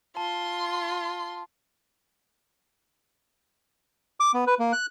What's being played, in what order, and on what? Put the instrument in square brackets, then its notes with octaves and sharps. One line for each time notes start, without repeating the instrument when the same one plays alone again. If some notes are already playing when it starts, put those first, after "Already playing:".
[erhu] F4 [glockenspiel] A5 [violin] C6
[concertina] D6
B3
B4
A#3
F#6